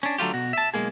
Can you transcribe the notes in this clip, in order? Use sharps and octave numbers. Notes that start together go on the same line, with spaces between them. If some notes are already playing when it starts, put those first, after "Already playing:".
C#4 D4
D3 F#3 A3 F4 G4
B2 F#4
E5 A5
B1 C3 G#3 A#3 G#4